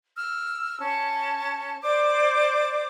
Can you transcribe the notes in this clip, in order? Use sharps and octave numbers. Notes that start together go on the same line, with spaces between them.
E6 F6
C#4 A5
C5 D5 D6